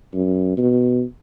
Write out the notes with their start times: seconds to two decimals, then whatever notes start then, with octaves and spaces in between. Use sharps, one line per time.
0.14 F#2
0.57 B2